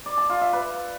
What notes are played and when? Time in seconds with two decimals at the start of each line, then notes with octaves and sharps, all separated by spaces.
0.06 D5
0.18 A5
0.29 F4
0.41 E5
0.53 B4